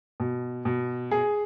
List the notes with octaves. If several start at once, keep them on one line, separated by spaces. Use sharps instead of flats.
B2
B2
G#4